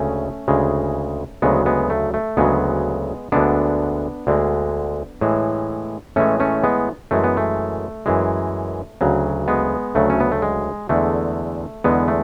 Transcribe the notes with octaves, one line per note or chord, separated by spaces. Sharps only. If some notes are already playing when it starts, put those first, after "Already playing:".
Already playing: D2 C#3 G#3 A3 C#4
D2 C#3 G#3
D2 C#3 F#3 G#3 B3
G#3 B3
A3
A3
D2 C#3 F#3 G#3 B3
D2 D3 G#3 B3 D4
D2 D3 G#3
A2 E3 G#3
A2 E3 G#3 A3 C#4
A3 C#4
G#3 B3
F#2 E3 G#3 A3
B3
A3
F#2 E3 G#3
D2 C#3 F#3
G#3 B3
D2 C#3 F#3 A3
C#4
B3
A3
G#3
E2 D3 G#3 A3
E2 D3 G#3 B3
A3